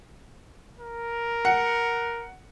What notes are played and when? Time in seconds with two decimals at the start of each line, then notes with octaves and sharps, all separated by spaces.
0.79 A#4
1.45 F#5 C#7